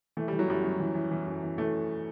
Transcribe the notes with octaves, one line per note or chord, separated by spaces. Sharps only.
E3 A3
E3 G3
F#3
F#2 G3
F#2
E3
E3
E3
F#2
E3
E3 A3